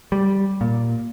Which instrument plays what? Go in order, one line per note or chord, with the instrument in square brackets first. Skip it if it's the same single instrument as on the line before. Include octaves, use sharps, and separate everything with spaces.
[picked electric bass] G3
A#2